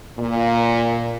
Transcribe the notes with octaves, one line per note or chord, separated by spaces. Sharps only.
A#2